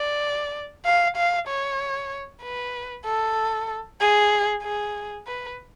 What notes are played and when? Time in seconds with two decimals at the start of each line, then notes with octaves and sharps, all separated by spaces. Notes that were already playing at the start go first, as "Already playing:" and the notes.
Already playing: D5
0.85 F5
1.17 F5
1.47 C#5
2.42 B4
3.05 A4
4.01 G#4
4.63 G#4
5.27 B4